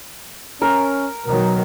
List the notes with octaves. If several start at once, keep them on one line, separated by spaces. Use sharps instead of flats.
C#4 A#4
B2 D#3 F#3 A#4